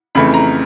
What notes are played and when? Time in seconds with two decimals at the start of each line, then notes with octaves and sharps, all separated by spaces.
0.15 F2 C#3 E3 A3 B5
0.34 A#5